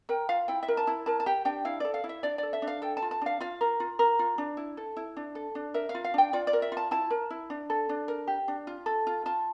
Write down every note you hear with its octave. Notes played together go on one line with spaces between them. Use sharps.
A#4 G5
F4 F5
E4 G5
E5
A#4
A5
E4
A#4 A5
A5
G4 G5
D4 G5
E4 F5
A4 D5
F5
E4
E5
D4 D5
A4 D5
E5
D4
F5
A4 G5
A5
F4
A5
D4 F5
F4 F5
A#4
F4
A#4
F4
D4
E4
A4
E4
D4
A4
D4
A#4 E5
F5
F4
F5
D4 G5
F4 D5
D5
A#4
E5
F4
A5
E4 A5
A#4
E4
D4
A4
D4
A#4
G4
D4
F4
A4
F4
F4 A5